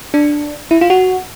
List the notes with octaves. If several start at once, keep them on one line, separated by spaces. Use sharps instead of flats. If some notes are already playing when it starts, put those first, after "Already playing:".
D4
E4
F4
F#4